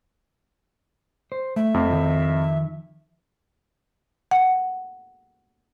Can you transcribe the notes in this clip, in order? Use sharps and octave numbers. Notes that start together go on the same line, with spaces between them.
C5
A3 E5
F2
D#3 F3
F#5